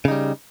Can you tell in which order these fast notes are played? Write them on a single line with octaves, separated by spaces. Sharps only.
C#3 D#4 G3